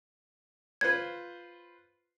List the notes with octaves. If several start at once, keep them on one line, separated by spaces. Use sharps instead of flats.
F4 B4 C5 G#6